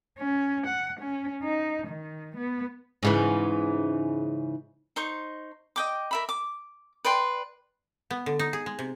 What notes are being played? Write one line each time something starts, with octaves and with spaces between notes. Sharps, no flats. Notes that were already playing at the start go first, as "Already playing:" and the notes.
C#4
F#5
C#4
D#4
D#3
B3
G#2 C#3 E3
D#4 C5 C#6
D#5 G5 D6
A#4 E5 B5
D6
B4 D5 G5 C6
B3
D3
D#4
G#4
G#3
C3